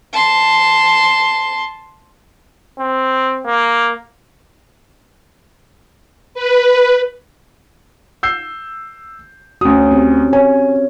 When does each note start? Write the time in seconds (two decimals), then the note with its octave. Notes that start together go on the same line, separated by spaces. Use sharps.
0.13 A5 C6
2.79 C4
3.46 A#3
6.34 B4
8.23 E6 G6 C7
9.61 D2 C#4 F#4 D#6
9.92 C4 G4
10.33 C#5 G#5